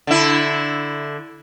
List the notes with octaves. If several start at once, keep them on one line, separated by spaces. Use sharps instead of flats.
D3 E4